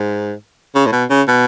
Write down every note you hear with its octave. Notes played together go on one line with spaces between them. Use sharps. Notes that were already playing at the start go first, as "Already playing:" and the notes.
Already playing: G#2
C#3
A2
B2
C#3
B2